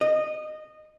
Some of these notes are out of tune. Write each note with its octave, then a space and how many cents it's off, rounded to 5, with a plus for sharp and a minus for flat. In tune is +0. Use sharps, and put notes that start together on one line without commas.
D#5 -15